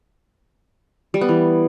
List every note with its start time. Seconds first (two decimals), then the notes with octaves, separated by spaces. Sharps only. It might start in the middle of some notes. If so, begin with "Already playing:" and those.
1.14 G3
1.21 B3
1.29 E3